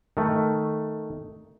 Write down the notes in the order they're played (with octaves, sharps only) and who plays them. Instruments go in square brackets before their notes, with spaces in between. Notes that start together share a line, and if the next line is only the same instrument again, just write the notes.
[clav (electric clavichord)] D#3 A3